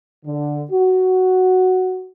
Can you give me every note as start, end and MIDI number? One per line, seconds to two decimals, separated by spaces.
0.25 0.63 50
0.70 2.09 66